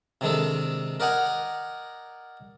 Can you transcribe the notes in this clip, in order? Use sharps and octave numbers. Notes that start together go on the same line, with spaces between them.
C3 D#3 G#3 D4 A4
A#4 D5 D#5 F#5 G#5 A#5